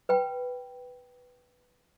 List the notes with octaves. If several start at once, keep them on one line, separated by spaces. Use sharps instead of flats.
B4 G5 B5